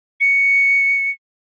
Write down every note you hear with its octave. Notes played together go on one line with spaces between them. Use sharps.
C#7